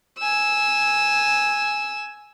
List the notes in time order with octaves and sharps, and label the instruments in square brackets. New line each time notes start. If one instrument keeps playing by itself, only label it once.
[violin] G#5 E6